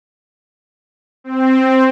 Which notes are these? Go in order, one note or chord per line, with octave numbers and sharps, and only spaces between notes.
C4